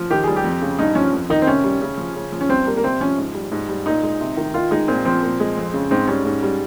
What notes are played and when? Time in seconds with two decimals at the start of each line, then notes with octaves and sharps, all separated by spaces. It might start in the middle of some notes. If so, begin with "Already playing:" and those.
Already playing: F3
0.10 D#3 G4
0.24 G3 G#4
0.36 G4
0.44 F2
0.62 C#3
0.79 G2 D#4
0.95 F3 C#4
1.13 F2
1.30 D#3 D#4
1.42 C4
1.47 C3 C#4
1.64 G3
1.81 C#3
1.97 F3
2.15 C#3
2.32 F3
2.41 C#4
2.49 G2 C4
2.66 G3 A#3
2.77 A#3
2.83 C3 C4
3.00 F3 C#4
3.18 G#2
3.35 G3
3.52 G#2
3.69 G3
3.86 A#2 D#4
4.03 G#3
4.21 C3
4.37 D#3
4.54 D#3 F4
4.71 G#3 D#4
4.88 A#2 C4
5.05 F3 C4
5.23 A#2
5.40 G#3
5.57 F2
5.74 C#3
5.91 G#2 C4
6.08 G3 C#4
6.25 G#2
6.43 G3